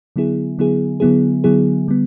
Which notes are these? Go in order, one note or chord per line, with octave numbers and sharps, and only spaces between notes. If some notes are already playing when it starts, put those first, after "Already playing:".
D3 F#3 B3 E4 G#4
D3 F#3 B3 E4 G#4
D3 F#3 B3 E4 G#4
D3 F#3 B3 E4 G#4
D3 G3 B3